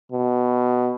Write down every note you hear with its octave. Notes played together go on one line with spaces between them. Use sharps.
B2